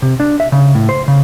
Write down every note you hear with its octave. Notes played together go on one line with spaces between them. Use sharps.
C3
D4
E5
C#3
A2
C5
C#3